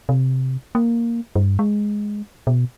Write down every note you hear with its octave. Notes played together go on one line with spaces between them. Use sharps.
C3
A#3
G2
G#3
B2